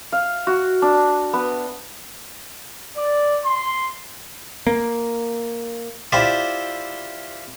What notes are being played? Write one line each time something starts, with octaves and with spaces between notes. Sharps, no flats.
F5
F#4
D4
B3
D5
C6
A#3
E4 F4 G4 C5 D5 E5